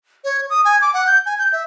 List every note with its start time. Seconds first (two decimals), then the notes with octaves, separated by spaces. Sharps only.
0.24 C#5
0.50 D#6
0.65 G#5
0.82 D6
0.94 F#5
1.07 G6
1.26 G#5
1.39 G6
1.52 E5